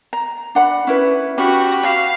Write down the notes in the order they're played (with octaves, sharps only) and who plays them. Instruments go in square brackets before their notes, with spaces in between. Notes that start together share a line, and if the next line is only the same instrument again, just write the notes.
[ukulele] A#5
D4 F#5 B5
C#4 E4 B4
[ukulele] C#4 [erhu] F#4 [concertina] G4 B5
[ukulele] F#4 [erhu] F5